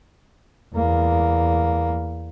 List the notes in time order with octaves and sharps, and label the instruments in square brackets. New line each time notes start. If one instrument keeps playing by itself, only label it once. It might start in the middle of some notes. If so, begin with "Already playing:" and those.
[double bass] E2 A#3